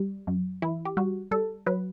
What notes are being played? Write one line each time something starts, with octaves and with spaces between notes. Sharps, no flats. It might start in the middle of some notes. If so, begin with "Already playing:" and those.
Already playing: G3
F#2
E3 E4
G4
G3 F#4
G3 A4
F#3 B4